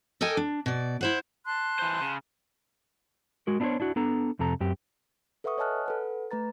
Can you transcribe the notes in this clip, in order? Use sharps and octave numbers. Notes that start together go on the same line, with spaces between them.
A4 A#4 D#5 G5 G#5
D4
B2 D5
E4 C5 F#5
A5 C6 F#6
E3 C5
C#3
G#3 F#4 A#4
B3 D4 E4 F4 C5 C#5
D4 E4 F#4
B3 D4 A4 A#5
F2 C3 A4 A#5
F#2 C4 G4
A4 B4 E5 F#5 C#6 D#6
C#5 D#5 G#5 A5 F6 F#6
A4 B4 F#5
A3 B4 A#5 A6